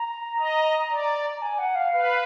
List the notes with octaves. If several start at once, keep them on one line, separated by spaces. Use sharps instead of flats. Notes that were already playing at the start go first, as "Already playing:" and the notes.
Already playing: A#5
D#5
D5
A#5
G#5
F#5
F5
B4 F5